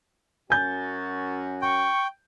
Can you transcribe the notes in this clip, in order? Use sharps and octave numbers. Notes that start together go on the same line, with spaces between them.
F#2 C#4 F#4 G#5 G6 A6
G5 C#6